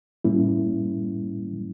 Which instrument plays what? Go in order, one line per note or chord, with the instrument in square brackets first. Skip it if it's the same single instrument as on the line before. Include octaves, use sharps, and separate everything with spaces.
[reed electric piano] A2 G3 A#3 C#4 E4